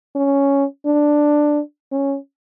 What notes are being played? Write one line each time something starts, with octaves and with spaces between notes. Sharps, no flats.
C#4
D4
C#4